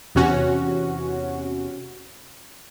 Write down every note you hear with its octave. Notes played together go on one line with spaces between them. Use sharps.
E2 C3 C#4 F#4